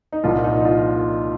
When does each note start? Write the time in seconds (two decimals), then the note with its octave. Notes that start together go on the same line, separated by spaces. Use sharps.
0.13 D#4
0.23 C2 A#2 F3 F4
0.44 D#4
0.65 F4